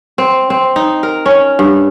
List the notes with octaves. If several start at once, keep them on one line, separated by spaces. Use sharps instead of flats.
C4
C4
D#4
A#4
C#4
G2